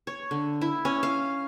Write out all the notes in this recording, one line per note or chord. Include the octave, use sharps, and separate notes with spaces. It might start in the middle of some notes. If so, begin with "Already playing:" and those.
C#5
D3
E4
C#4
F5